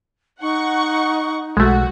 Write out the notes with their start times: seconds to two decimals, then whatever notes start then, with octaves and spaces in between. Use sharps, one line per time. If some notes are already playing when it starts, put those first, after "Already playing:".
0.41 D#4 F#5 C#6
1.57 B1 G#3 A3 F#4